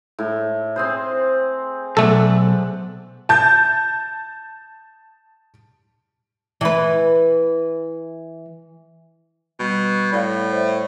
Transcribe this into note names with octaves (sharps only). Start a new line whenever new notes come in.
A2
C4 G#4 C5
B1 A3 D4 A4 D5 F#5
A5 G6
E3 B4
B2 G3
A2 D5 F5
C5 D5 E5